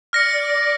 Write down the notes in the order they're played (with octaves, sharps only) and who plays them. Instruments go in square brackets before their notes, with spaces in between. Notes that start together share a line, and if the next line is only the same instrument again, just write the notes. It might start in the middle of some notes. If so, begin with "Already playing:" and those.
[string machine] D5 [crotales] F6 A#6 C#7